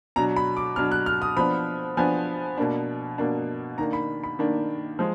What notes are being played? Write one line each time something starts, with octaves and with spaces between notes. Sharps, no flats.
B2 F#3 D4 A#5
B5
D6
B2 F#3 D4 F6
F#6
F6
D#6
F3 B3 D4 B5
F3 B3 D4 G#5
B2 A#3 D4
B2 A#3 D4
D#3 A#3 D4 A#5
B5
B5
D#3 A#3 D4
F3 G#3